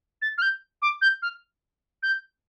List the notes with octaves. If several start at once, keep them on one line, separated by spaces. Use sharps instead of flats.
A6
F6
G6
D6
G6
F6
G6